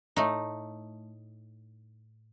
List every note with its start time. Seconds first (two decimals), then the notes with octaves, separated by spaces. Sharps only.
0.16 A2 A3 D#4